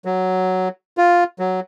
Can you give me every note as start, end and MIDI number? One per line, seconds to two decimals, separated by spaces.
0.05 0.68 54
0.98 1.24 65
1.39 1.60 54